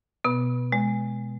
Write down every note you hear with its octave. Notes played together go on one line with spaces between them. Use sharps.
B2 B3
G#3